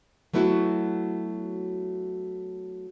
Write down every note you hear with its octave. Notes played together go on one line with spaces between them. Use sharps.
F#3 A3 B3 E4 F#4